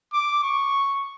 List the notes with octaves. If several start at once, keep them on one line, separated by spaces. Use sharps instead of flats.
D6
C#6